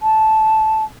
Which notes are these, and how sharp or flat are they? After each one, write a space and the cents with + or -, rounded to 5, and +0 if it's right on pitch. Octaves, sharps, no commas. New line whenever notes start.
A5 -10